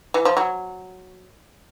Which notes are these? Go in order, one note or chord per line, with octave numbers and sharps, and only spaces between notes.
E3
F3
F#3